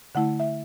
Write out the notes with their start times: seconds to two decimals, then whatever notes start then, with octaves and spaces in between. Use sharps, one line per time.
0.15 D3 A3 E4 F#5
0.40 E5